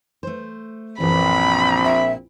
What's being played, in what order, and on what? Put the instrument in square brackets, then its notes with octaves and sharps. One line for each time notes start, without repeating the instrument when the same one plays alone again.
[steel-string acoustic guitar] A3 C5
[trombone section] A#1 C4 [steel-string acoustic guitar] F#2 E3 [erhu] B5
[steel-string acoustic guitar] A#2 [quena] E5